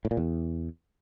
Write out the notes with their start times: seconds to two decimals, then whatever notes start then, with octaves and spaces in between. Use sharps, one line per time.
0.05 A2
0.11 A#2
0.17 E2